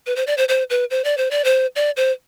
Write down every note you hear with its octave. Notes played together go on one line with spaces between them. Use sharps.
B4
C5
D5
C5
C5
B4
C5
D5
C5
D5
C5
D5
C5